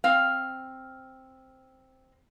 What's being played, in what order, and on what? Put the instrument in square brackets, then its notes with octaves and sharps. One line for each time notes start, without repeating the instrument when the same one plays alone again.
[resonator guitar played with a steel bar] C4 F5